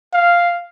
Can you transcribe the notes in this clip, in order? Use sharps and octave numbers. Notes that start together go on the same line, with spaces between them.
F5